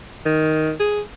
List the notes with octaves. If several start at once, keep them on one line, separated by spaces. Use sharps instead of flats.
D#3
G#4